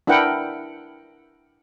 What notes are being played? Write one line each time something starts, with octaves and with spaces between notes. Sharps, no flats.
D4 E4 A#4 B4 F#5 G5